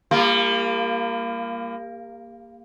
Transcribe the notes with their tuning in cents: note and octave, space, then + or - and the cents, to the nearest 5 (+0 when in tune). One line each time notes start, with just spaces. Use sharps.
G3 +40 A#3 +0 F4 -20